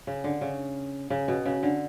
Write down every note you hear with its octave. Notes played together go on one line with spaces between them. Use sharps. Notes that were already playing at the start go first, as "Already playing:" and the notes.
C#3
D3
C#3
C#3
B2
C#3
D3